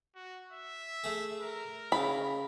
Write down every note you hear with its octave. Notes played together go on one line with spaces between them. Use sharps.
F#4
E5
A3 G#4
A#4
C#3 B5